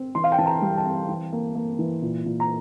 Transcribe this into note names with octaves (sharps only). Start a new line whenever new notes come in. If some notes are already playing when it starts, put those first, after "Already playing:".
Already playing: C4
E3 C6
F5
G5
E3 A5
A#5
G3
A5
C4
E3
A#3
A#3
E3
A#2
A#2
A#5